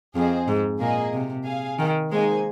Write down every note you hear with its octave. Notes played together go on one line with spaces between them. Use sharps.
F2 G#4 C5 D#5
G#2
A#2 A#3 G#4 D#5 G#5
C3
G#4 F5 G#5
D#3
G#3 A#3 D#4 C5 G#5